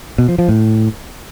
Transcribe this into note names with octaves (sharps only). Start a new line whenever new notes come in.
B2
F3
F3
A2